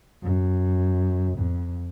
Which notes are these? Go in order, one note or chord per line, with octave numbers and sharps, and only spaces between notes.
F#2
F2